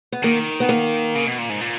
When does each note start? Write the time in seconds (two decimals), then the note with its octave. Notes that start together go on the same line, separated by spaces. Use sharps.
0.12 B3
0.23 D#3 A#3
0.60 B3
0.69 A#3
1.15 C#3
1.27 B2
1.38 A#2
1.49 G#2
1.61 A#2